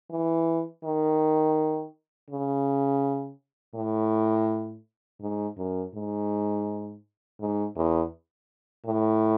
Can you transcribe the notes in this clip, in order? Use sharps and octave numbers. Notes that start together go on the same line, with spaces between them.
E3
D#3
C#3
A2
G#2
F#2
G#2
G#2
E2
A2